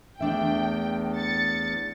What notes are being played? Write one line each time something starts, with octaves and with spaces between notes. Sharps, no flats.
E2 A3 D4 E5 G5
A6 C#7